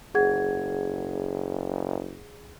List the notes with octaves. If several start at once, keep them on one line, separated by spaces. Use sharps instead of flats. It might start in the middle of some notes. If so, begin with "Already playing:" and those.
F#1 G#4 F#5 G#6